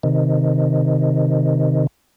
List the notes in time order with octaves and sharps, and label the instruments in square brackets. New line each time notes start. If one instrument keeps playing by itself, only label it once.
[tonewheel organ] C3 D#3